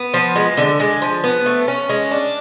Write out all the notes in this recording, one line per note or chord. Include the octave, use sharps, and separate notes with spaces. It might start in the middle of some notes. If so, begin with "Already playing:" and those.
Already playing: B3
F3
G#3
D3
G#3
F3
B3
A3
C#4
G#3
D4